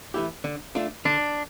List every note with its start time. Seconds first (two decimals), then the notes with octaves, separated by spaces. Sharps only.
0.14 E3 A3 E4 G4
0.44 D3
0.75 A3 D4 F4
1.05 D3 D4